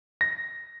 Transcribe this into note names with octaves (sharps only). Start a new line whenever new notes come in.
A#6